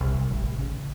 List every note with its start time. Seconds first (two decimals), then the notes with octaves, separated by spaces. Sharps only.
0.01 C2
0.30 A1
0.58 C#3